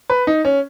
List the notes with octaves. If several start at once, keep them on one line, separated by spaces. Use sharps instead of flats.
B4
D#4
C#4